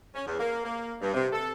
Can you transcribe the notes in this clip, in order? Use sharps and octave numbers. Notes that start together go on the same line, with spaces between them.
C#4
E2
A#3
A#3
G2
C3
A4